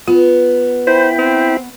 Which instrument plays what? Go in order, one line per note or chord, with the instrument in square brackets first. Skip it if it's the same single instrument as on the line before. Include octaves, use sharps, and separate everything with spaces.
[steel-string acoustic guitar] B3 [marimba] F4
[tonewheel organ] E4 G5 B5 [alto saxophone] C5
[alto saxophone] C4